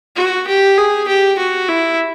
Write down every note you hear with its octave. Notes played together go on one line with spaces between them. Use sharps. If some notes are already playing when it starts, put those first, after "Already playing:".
F#4
G4
G#4
G4
F#4
E4